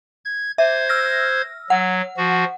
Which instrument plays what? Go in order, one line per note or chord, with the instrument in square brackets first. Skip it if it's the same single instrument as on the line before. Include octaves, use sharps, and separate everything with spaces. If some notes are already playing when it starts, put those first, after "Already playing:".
[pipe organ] G#6
[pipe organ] C5 G#6 [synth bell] E5
[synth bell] E6 F6 A#6
[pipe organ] F#3 [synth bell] F#5
[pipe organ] F3 F#4